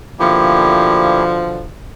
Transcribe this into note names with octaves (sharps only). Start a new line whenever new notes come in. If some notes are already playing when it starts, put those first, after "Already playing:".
B2 D3 F3 A#3 E4 G4